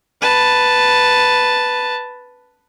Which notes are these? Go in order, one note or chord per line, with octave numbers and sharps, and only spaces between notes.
B4 A5